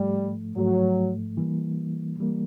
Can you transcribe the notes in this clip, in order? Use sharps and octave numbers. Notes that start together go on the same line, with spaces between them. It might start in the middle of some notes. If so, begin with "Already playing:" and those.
Already playing: G#2 F3 G3 A3
G#2 F3 F#3 A3
E3 G3 A#3
E3 G3 A#3